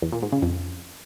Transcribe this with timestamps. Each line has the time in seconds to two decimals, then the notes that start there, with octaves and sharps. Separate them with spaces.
0.02 E2
0.12 A#2
0.22 G#2
0.32 C#3
0.42 F2